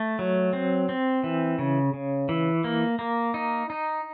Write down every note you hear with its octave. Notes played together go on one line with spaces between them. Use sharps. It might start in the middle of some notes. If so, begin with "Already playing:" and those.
Already playing: A3
F#3
C4
C4
E3
C#3
C#3
E3
A#3
A#3
D#4
D#4